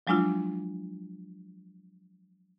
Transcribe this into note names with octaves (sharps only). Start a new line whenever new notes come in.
F3 F#3 G#3 D4 E4 F4